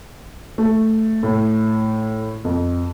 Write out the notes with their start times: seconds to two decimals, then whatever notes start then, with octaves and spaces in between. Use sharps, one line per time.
0.58 A3
1.23 A2
2.45 F2